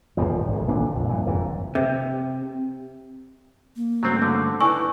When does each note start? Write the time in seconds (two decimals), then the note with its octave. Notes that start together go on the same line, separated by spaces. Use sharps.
0.17 D1 C2 A#2 F3
0.48 G#1 D2
0.67 B1 A#2 D3 D4
0.92 A#1 F2
1.07 G2 A#2 E3
1.26 F#1 F2 G#2 E3
1.75 C3
3.76 A#3
4.03 G2 C#3 F#3 A3 C4
4.22 D3 G6
4.60 D#4 E4 B4 D5 G#5 C#6 E6